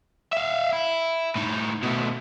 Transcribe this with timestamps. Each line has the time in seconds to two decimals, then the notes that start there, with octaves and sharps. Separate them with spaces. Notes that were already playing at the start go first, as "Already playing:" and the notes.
0.33 E5 F5
0.73 E4
1.36 A2 D#4
1.83 B2 A3